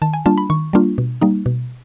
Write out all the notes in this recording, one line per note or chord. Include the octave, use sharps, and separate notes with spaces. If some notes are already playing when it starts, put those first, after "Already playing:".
D#3 A5
G#5
G3 A#3 D4 F4 A5
B5
D#3 C#6
G3 A#3 D4 F4
B2
G3 A#3 D#4
B2